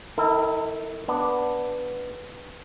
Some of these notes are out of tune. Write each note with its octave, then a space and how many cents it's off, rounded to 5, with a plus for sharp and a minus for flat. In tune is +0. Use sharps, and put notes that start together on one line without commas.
D#3 +15 E4 -25 A4 +45
B3 -5 D4 +0